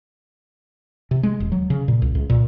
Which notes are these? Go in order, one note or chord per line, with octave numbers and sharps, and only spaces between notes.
C3
G#3
D#1
F#3
C#3
A#2
C#2
C#2
A#2